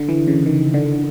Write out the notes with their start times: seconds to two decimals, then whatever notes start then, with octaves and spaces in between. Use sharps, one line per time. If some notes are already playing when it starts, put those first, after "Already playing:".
Already playing: D3
0.09 E3
0.27 C#3
0.46 D#3
0.74 D3